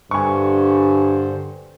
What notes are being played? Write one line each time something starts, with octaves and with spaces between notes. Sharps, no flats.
G2 D3 G3 C5 G#5 C#6